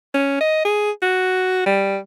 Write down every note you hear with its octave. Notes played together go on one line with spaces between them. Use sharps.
C#4
D#5
G#4
F#4
G3